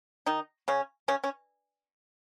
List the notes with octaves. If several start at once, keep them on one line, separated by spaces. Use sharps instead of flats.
D#3 D#4
C#3 C#4
C#3 C#4
C#4